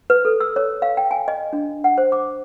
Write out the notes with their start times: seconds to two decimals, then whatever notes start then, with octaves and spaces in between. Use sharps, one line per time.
0.10 B4
0.25 A4
0.40 E6
0.56 C#5
0.82 F5
0.97 G5
1.11 G#5
1.28 D#5
1.53 D4
1.84 F#5
1.98 C5
2.12 D6